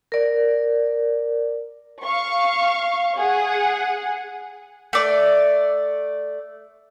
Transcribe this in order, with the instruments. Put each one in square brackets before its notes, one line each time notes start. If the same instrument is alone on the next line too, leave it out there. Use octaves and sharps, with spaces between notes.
[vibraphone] A#4 D5
[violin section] F5 C#6
G#4 F#5
[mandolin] A3 D5